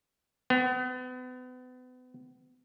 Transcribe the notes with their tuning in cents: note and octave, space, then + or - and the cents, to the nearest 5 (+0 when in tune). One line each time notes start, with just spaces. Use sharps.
B3 +35